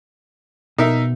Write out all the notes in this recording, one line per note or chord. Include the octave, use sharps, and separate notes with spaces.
B2 D#4 A#4 E5